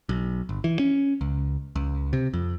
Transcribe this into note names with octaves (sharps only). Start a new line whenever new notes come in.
B1
G1
E3
C#4
C#2
C#2
C3
F2